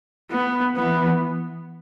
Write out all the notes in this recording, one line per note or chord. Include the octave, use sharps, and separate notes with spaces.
B3
E3 B3